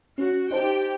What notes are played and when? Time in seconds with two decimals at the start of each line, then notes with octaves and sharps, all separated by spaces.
0.18 C#4 F#4
0.51 D#4 G4 C5 G5 A5